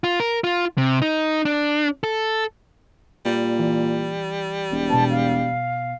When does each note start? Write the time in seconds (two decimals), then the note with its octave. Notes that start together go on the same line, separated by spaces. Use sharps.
0.04 F4
0.20 A#4
0.44 F4
0.78 C3
1.02 D#4
1.45 D4
2.04 A4
3.26 A#2 G3
3.59 E3
4.72 E1
4.90 B2 B3 A5
5.11 F5